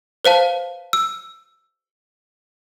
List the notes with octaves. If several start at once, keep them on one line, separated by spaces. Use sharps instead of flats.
B4 C5 F5 A5
E6